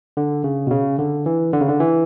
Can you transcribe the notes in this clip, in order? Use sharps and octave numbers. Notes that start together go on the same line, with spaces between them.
D3
C#3
B2
C#3
D3
E3
D3
C#3
D3
E3